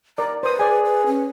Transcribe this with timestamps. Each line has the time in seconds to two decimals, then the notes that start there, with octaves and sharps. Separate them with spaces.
0.18 A#4 D5 A#5
0.43 B4 C5 D#6
0.59 G#4 D5 G#5
0.85 B4
1.07 C#4